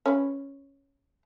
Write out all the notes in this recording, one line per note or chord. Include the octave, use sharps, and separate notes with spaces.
C#4 B4